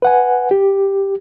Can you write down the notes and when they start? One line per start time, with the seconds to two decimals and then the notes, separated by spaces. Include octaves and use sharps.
0.02 B4 F#5 G#5
0.51 G4